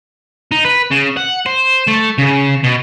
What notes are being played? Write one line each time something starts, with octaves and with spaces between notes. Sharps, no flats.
D#4
B4
C#3
F#5
C5
A3
C#3
B2